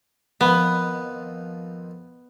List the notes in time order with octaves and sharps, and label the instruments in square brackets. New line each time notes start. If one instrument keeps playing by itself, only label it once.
[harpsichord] F2 D#3 F3 [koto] B3